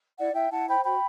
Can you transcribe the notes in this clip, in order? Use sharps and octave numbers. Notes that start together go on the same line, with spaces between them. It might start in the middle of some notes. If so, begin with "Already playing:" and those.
E4 D5 F#5
E4 E5 G5
E4 F#5 A5
C5 G5 B5
F#4 G5 B5